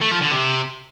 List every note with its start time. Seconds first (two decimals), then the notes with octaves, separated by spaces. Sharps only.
0.02 A3
0.11 F3
0.22 D3
0.32 C3